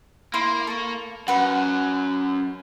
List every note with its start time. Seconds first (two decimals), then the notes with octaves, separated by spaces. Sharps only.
0.34 A#3 E4 C6
0.67 A4 C#6
1.28 F#2 B4 F#5